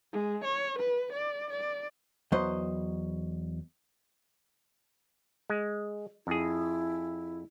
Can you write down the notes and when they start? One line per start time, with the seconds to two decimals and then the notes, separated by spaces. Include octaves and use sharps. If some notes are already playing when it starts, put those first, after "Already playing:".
0.12 G#3
0.44 C#5
0.79 B4
1.13 D5
1.50 D5
2.32 E2 F#3 B3 C5 D#5
5.50 G#3
6.27 F2 E4 G#4